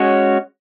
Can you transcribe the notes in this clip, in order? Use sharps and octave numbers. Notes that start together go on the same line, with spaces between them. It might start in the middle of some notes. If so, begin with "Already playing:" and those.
Already playing: G#3 C#4 F#4 C#5